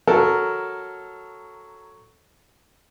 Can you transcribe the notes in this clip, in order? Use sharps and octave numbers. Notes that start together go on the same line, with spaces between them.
F#3 A4 A#4